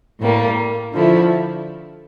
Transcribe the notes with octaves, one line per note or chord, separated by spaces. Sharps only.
A2 G3 A#3
D3 F3 A3 E4